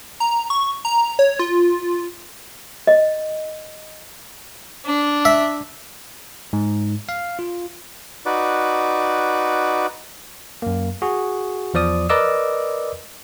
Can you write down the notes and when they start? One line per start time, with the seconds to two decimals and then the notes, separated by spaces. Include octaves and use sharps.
0.20 A#5
0.50 C#6
0.85 A#5
1.19 C#5
1.39 F4
2.87 D#5
4.85 D4
5.25 E5
6.53 G#2
7.09 F5
7.39 F4
8.26 D#4 F#4 B4 D5
10.62 F#2 A#3
11.02 F#4 G#4
11.74 E2 F3 D5 D#6
12.09 A#4 B4 D5 D#5 D6 E6